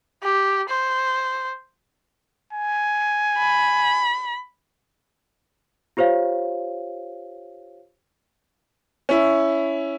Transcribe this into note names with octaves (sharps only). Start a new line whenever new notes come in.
G4
C5
G#5
B5
F4 G4 C5 C#5 F5
C#4 E4